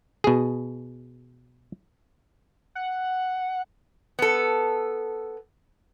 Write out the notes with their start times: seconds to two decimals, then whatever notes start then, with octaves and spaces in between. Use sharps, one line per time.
0.24 B2 G#4
2.75 F#5
4.19 B3 A4